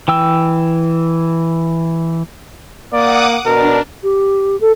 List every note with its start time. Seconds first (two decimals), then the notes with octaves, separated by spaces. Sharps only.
0.08 E3 G5 E6
2.93 A#3 D5 F#5 D6 D#6
3.46 B2 D4 A#4
4.03 G4
4.61 A4